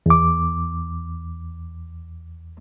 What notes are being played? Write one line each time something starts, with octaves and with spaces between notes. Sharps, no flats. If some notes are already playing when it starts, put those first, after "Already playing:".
E2 D6